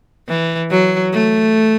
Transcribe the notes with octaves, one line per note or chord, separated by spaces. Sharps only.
E3
F#3
A3